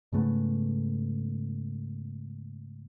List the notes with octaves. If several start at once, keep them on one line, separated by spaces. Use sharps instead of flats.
G#2 C#3 A3 B3